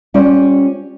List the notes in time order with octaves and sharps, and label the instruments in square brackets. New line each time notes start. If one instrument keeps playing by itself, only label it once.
[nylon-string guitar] G3 C#4 F4 C5 D5